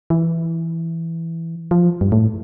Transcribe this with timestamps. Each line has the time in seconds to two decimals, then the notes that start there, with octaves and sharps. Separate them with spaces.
0.10 E3
1.71 F3
2.01 G2
2.12 A2